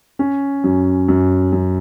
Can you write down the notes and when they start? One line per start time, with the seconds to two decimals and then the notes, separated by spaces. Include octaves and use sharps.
0.19 C#4
0.64 F#2
1.08 F#2
1.53 F#2